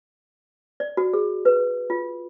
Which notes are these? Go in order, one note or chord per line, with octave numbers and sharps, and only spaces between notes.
D5
F#4
G#4
B4
F4